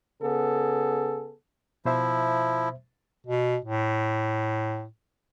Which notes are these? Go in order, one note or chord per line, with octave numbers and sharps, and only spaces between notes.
C#3 B3 G#4 A4
B2 F3 E4 C5 E5
B2
A2